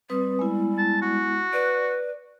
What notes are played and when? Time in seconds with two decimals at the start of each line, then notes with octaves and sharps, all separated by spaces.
0.10 G3 C4 B4 D#6
0.39 G#3 B3 E4
0.78 A5
1.02 F#4
1.53 B4 D5